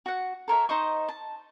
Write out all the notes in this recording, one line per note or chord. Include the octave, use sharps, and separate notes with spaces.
F#4 F#5
A4 A#4 C#5 E5
D#4 C5 D#5 C#6
A5